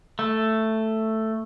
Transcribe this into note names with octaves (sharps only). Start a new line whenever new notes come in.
A3